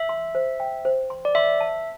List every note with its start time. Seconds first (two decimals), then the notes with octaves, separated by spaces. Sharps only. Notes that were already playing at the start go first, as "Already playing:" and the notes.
Already playing: E5
0.09 C6
0.35 C5
0.60 G5
0.85 C5
1.10 C6
1.25 D5
1.35 E5 C6
1.60 A5